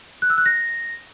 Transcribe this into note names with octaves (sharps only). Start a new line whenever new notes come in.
F#6
E6
F#6
A#6